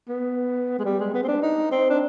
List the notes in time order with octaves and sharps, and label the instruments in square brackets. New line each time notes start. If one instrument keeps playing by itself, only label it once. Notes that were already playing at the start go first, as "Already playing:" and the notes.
[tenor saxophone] B3
G#3
G3
G#3
B3
C4
D4
D#4
C4
D4